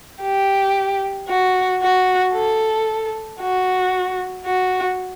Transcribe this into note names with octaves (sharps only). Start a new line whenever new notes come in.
G4
F#4
F#4
A4
F#4
F#4